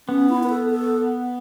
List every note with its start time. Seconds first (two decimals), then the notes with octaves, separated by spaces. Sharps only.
0.08 B3 C#4
0.30 E4
0.43 B4
0.50 A4
0.70 A4